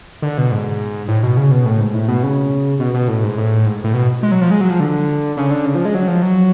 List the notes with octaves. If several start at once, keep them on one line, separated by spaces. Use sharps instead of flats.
D3
B2
G#2
A2
B2
C#3
B2
A2
G#2
A2
B2
C#3
B2
B2
A2
G#2
A2
G#2
A2
B2
G#3
F#3
F3
G#3
F#3
F3
D3
C#3
D3
C#3
F3
G#3
F#3
F3
F#3